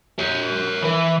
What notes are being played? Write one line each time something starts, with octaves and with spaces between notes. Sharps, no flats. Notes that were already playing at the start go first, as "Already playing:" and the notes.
A#4 C#5
E3